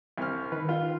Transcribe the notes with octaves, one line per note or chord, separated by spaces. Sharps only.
C2 F6
D#3 B4
F4